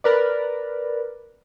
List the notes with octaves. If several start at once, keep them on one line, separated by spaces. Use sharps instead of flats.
A#4 B4 D5